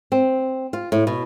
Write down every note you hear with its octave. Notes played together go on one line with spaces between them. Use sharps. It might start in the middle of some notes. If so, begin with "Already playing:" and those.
C4
F4
A2
B2